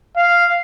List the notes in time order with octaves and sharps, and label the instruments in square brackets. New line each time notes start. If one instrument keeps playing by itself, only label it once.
[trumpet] F5